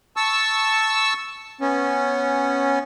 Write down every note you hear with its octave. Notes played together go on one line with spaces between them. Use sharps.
A5 C#6 E6
B3 C#4